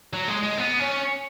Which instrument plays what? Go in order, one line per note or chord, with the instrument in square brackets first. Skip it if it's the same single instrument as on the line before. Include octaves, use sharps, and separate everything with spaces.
[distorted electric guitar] F#3
G#3
G#3
B3
C#4